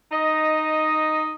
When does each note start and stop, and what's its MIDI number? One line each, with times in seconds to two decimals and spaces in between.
0.12 1.34 63
0.12 1.34 75